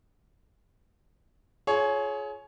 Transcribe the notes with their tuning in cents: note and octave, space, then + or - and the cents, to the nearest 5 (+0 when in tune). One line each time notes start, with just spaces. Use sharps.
F4 +0 G#4 +30 C#5 +0